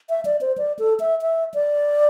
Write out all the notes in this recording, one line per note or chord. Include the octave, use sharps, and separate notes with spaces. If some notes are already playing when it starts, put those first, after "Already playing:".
E5
D5
C5
D5
A4
E5
E5
D5